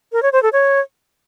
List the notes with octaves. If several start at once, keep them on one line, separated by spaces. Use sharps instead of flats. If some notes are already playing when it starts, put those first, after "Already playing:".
A#4
C#5
C5
A4
C#5